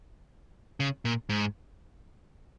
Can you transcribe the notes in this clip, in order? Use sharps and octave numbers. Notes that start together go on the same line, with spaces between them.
C#3
A#2
G#2